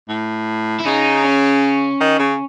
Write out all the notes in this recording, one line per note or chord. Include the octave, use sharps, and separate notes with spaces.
A2
E4
C#3 D#4
C#4
D#3
C#3